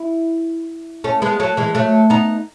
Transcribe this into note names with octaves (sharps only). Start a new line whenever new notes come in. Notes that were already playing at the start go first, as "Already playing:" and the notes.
Already playing: E4
A3 C#4
G#3 B3
F#3 A3
E3 G#3
F#3 A3
B3 D#4